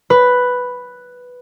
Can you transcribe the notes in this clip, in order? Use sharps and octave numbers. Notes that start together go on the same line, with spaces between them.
B4